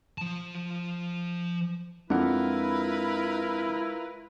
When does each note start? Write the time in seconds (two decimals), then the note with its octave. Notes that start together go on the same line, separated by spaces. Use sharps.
0.18 F3 A5
2.10 F2 G#3 D4 E4 F4 A#4 B4 F#5